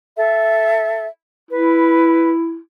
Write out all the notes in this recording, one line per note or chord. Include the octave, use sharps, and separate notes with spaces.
A4 E5
E4 B4